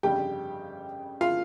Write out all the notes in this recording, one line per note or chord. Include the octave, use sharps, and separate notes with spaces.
G1 F2 C#3 G3 G4 G5
F4 F5